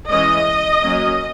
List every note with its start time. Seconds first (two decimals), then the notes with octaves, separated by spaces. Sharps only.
0.11 E3 G#3 C#4 D#5
0.83 F#3 A#3 C#4